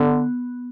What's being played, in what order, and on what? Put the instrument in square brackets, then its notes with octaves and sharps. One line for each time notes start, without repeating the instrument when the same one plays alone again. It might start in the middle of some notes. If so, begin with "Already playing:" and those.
Already playing: [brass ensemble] D3 [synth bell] B3